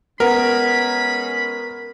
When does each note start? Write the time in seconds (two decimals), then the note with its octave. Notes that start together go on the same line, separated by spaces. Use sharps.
0.20 G#3 B3 C#4 A#4 B5